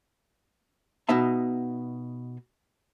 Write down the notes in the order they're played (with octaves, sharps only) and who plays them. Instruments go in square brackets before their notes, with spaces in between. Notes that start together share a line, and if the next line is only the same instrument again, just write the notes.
[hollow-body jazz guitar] B2 B3 D#4 E5 A5